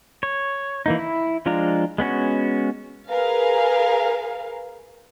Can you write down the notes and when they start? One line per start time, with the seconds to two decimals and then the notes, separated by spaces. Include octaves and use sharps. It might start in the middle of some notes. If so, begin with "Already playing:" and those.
0.23 C#5
0.86 E3 A#3 D#4
0.99 E4
1.46 F3 G#3 D4 F4 A#5
1.98 G#3 B3 C#4 F#4
3.08 G#4 A#4 B4 F5